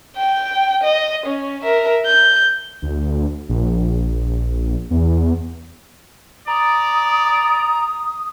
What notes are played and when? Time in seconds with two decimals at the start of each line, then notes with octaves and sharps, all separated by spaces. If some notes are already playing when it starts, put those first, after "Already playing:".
0.17 G5
0.83 D#5
1.26 C#4
1.62 A#4 E5
2.06 G6
2.82 D2
3.49 A#1
4.90 E2
6.48 D5 A#5 D#6